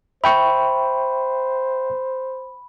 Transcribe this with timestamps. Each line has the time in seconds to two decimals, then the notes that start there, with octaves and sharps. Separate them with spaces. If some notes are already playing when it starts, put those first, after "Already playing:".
0.24 C5 E5 G5 B5 C#6